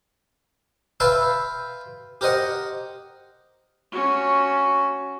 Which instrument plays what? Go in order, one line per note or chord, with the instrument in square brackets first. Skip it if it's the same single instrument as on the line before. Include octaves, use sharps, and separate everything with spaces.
[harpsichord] B4 E5 F5 G5 A5 C6
G4 A#4 C5 D#5 F#5
[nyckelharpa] C#4 F#4